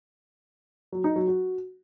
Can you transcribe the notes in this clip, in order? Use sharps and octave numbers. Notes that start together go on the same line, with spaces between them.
F#3
D#4
F#3
F#4